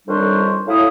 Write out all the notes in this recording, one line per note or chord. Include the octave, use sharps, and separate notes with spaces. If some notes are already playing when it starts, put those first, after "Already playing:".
F2 D#3 G3 D4 C5 C#5
A2 F#3 E4 F5 D#6